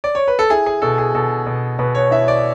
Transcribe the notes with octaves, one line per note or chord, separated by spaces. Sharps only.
D5
C#5
B4
A4
E4 G#4
G#4
B2 A4
G#4
B2 A4
B2
B2 B4
C#5
E4 E5
D5